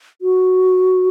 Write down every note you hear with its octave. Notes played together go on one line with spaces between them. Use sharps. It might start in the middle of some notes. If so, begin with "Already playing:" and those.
F#4